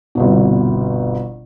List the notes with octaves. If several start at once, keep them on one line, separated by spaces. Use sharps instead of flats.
G1 C2 B2